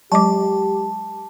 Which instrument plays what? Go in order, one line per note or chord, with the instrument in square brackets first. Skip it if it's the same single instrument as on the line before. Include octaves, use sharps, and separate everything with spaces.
[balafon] F#3 G#3 D6 [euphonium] G4 [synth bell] A5